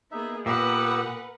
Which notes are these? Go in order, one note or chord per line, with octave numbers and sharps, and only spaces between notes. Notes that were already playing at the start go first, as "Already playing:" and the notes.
A#3 B3 D#4 G#4 E5
A#2 B3 G4 A#4 B4 F#5 E6